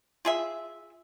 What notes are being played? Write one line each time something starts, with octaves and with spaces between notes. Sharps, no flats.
F4 G#4 E5